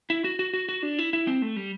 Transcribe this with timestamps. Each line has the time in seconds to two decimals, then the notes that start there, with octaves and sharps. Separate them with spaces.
0.10 E4
0.24 F#4
0.39 F#4
0.54 F#4
0.69 F#4
0.83 D4
0.99 E4
1.13 E4
1.27 C4
1.42 A3
1.56 G3